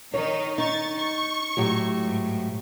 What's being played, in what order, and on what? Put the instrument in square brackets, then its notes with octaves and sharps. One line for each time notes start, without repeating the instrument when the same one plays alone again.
[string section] D#3 D#4 [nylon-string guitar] C#5
[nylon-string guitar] D#4 [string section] C#6 A6
[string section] C#6
[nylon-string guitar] A2 F#3 G4
[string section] G#2